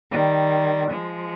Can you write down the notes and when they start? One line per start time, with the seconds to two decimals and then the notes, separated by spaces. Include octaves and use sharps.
0.10 D#3 G3
0.91 F3 G#3